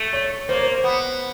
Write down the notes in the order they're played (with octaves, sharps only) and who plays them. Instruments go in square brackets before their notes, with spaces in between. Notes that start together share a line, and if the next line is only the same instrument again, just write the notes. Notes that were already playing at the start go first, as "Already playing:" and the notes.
Already playing: [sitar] A3
[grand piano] C#5
[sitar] A#3 [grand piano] C5
[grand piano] C#5
C5
[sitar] B3